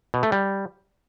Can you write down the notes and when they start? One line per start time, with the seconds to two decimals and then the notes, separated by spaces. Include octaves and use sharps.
0.14 B2
0.23 A3
0.32 G3